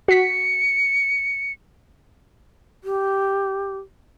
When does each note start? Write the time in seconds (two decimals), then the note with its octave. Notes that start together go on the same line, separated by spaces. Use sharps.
0.08 F#4 B6 C#7
2.84 G4